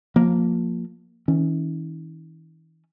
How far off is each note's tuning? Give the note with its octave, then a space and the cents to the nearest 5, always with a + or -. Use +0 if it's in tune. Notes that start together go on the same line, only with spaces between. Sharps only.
F3 +20 A#3 +0
E3 -45 C#4 +0